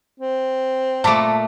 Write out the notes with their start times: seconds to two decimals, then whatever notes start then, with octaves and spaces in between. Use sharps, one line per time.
0.20 C4
1.04 A#2 A3 A5 B5 D6